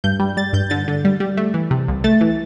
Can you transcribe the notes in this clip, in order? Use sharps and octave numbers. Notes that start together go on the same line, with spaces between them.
G2 G6
G3
G3 A6
G2 G6
D3 A6
D3
G3
G3
A3
E3
C3
C2
A3 A6
E3